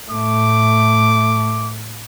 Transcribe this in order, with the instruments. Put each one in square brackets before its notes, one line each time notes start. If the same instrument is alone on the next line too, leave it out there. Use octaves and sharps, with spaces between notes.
[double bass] A2 A3 [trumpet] D6